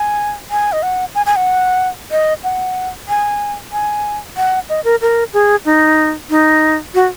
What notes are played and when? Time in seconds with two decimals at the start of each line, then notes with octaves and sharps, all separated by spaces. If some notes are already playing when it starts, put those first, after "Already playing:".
Already playing: G#5
0.51 G#5
0.72 D#5
0.83 F#5
1.15 G#5
1.26 G#5
1.36 F#5
2.11 D#5
2.44 F#5
3.08 G#5
3.72 G#5
4.37 F#5
4.69 D#5
4.84 A#4
5.01 A#4
5.33 G#4
5.65 D#4
6.30 D#4
6.94 F#4